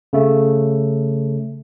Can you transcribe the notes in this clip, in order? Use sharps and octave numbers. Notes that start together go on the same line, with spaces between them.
C#3 A3